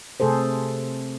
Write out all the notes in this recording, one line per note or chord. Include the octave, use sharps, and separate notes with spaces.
C3 A3 G#4 A4 C5